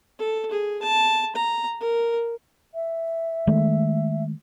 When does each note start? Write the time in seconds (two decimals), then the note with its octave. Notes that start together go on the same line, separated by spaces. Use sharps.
0.19 A4
0.51 G#4
0.82 A5
1.35 A#5
1.80 A#4
2.74 E5
3.47 D#3 G#3 A3